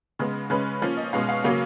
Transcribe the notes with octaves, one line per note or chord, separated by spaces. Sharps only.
C#3 G#3 B3
C#3 G#3 C#4 B4
F3 A#3 C#4
D#5
B2 G#3 C#4 F5
F5
C#3 F#3 A#3 C#4 F5